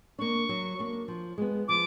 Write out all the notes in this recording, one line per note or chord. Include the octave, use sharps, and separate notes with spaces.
A#3 D4 C#6
F#3
A#3 D4
F3
G#3 B3
F3 D6